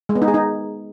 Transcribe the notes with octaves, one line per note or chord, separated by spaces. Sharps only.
G#3
B3
D#4
G#4
D#4